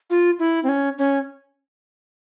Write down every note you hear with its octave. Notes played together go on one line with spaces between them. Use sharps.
F4
E4
C4
C#4
C#4